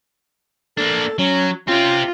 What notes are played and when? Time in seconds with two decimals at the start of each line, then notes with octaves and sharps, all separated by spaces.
0.78 A#3 D4 A4
1.19 F#3 C#4
1.68 C4 C#4 F4 G4